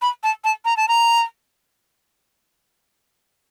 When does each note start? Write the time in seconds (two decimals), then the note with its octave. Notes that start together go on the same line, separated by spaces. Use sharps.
0.02 B5
0.23 A5
0.44 A5
0.65 A#5
0.77 A5
0.88 A#5